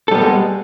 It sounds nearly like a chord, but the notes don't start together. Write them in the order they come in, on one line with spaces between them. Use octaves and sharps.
A4 G3 B3 A#3 G#3